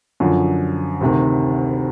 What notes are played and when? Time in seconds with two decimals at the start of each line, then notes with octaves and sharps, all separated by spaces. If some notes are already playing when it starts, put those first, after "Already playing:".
0.20 F#2 D3 F3
1.01 D2 C3 D#3